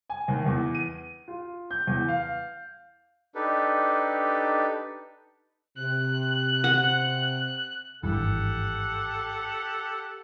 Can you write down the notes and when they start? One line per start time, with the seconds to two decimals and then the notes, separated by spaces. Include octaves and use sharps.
0.10 G#5
0.28 D#2
0.46 E2
0.75 D#7
1.28 F4
1.71 G6
1.87 E2
2.08 F5
3.35 D4 D#4 G4 A4 B4
5.77 C3 F#6
6.64 F#5
8.03 G#1 G2 E3 G4 A4 F#5